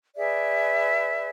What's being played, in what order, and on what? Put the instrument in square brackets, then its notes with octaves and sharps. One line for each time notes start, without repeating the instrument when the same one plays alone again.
[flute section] G#4 B4 D5 E5